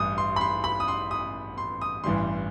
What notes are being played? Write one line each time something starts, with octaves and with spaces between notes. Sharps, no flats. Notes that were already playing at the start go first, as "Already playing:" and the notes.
Already playing: A1 G2 D#6
C6
B5
C6
B5
D#6
C6
D#6
C6
D#6
A1 G2 E3 G3 C6